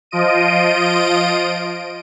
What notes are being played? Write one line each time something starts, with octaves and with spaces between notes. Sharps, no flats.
F3 F4 D#5 D7 D#7